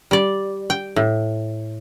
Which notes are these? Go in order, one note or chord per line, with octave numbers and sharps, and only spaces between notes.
G3 D5
G5
A2